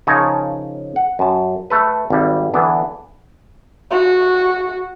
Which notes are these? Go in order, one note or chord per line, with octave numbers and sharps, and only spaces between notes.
C#3 F3 D#4 A#4 C#5 A5
F#5
F#2 A5
A3 A4 B4
G#1 G3
D3 E3 B3 D4
F#4